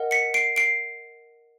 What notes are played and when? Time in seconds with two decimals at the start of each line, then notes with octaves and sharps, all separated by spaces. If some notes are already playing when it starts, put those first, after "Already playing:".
Already playing: A#4 D#5 F#5
0.11 B6 C#7
0.34 C7 D7
0.56 C7 D7